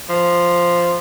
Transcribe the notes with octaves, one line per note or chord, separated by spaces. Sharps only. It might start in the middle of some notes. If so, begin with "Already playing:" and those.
F3